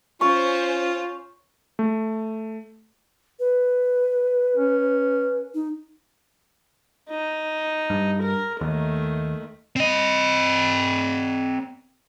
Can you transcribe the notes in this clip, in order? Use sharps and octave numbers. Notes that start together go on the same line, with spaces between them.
C#4 F4 C5 C#6
A3
B4
C#4
D#4
D#4
G2
A#4
D#2 D#3 A3
C4 D#5